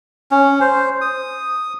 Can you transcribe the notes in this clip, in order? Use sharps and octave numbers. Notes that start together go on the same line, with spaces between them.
C#4
C5
D#6